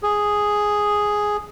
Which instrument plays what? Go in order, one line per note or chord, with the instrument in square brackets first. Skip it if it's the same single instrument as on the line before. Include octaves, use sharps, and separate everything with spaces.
[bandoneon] G#4